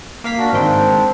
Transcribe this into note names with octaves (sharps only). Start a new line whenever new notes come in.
A#3 F5 B6
D4 F#4 A#4
G#2 D#3 C4 D4 G5